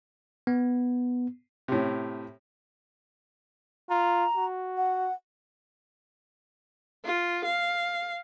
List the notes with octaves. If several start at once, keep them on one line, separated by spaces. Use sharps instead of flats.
B3
A2 C3
F4 A#5
F#4
F#5
F4
F5